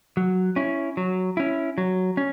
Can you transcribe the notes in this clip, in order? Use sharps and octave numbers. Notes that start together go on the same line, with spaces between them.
F#3
C#4 E4
F#3
C#4 E4
F#3
C#4